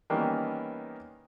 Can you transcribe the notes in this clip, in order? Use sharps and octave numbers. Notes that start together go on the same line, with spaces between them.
D#3 E3 G3 A#3 B3 C#4